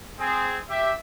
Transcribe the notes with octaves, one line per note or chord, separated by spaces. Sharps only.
C4 G#4
G4 E5